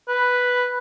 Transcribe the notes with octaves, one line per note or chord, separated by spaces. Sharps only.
B4